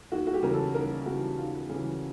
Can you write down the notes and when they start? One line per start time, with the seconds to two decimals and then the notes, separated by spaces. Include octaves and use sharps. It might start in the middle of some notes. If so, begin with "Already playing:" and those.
0.12 D#2 F#4
0.27 F#4
0.33 G4
0.43 C#3 E3 A#4
0.53 A4
0.74 D#2 A#4
1.06 C#3 E3 F#4
1.38 D#2 F4
1.70 C#3 E3